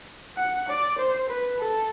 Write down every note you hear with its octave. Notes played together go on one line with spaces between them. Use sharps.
F#5
D5
C5
B4
A4